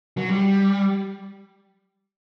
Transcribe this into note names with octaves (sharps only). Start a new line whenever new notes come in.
F#3
G3